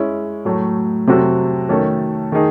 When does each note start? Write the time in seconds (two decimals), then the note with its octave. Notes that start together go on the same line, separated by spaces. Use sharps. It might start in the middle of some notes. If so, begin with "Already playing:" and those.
Already playing: G#3 C#4 E4
0.45 A2 F#3 A3
1.07 C3 F#3 C4 F#4 A4
1.69 D#3 A3 C#4 F#4 A4
2.32 D#3 A3 D#4 G#4